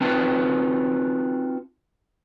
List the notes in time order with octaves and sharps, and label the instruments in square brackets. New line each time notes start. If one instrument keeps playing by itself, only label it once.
[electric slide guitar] C4 D#4 F4 F#4 B4 A5